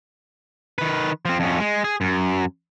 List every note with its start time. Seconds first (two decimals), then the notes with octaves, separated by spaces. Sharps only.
0.78 D#3 B4
1.25 F3 C4
1.40 F2 C#4
1.60 G#3
1.84 G#4
2.01 F#2